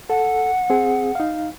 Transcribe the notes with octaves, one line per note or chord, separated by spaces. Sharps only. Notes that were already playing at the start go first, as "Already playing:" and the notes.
A4 F#5
C4 G#4
D#4 F5